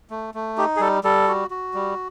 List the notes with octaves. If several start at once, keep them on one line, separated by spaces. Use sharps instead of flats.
A3
A3
D#4 G4
G#4
G3 A4
G3 A4
F#4
F#4
G3